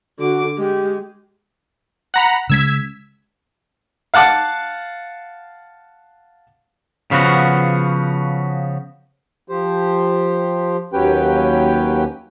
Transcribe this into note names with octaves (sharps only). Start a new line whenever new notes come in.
D3 F#4 D6
G#3 G4
F#5 A#5 B5
C#3 G#3 E6 G#6 B6
F5 F#5 A5 D6 F#6
C#3 F3 B3 F#4
F3 G4 C5
D#2 F#3 C#4 G4 B4 G5